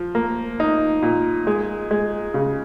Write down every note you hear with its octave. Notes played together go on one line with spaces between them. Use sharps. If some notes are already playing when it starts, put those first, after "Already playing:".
Already playing: F3
A#3
D#4
A#2
G#3
G#3
C#3